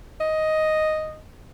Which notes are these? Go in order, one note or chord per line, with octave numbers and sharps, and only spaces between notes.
D#5